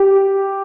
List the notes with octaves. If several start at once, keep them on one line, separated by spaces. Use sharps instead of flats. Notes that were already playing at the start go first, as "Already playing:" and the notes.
Already playing: G4